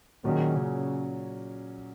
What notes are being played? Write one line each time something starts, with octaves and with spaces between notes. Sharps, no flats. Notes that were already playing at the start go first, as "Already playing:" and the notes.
A#2 D#3 F#3 C#4 G#4
C#3